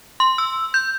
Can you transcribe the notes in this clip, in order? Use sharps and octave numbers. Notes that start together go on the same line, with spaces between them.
C6
E6
G6